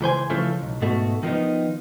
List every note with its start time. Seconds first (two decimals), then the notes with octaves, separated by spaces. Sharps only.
0.01 C#2 E3 C5 G#5
0.30 C#3 E3 F3 A3
0.62 B1
0.82 G#2 B2 A3 F#4
1.23 D#3 F3 B3 D#4